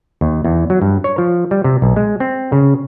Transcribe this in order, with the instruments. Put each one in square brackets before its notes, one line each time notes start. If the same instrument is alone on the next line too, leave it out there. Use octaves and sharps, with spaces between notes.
[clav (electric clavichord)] D#2
E2
F#3
G2
C#5
F3
G3
C3
B1
G#3
C4
C#3